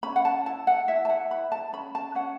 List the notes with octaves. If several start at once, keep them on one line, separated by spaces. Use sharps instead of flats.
C#4 B5
F#5
A5
E4 A5
F#5
E4 E5
A5
F#5
B4 B5
A5
C#4 B5
A5
C#4 F#5